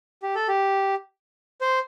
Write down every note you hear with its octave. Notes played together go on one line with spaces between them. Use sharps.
G4
A4
G4
C5